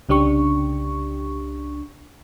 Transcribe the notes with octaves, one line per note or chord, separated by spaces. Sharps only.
C2 C#3 D4 G4 C#6